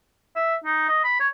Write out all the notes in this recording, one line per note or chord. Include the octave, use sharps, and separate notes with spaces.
E5
D#4
D#5
B5
C#5